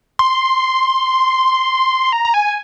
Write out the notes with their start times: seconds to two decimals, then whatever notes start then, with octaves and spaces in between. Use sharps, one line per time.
0.19 C6
2.12 A#5
2.25 A#5
2.34 G#5